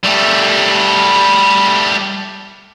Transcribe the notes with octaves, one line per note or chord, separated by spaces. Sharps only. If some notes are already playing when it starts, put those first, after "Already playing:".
G3 A3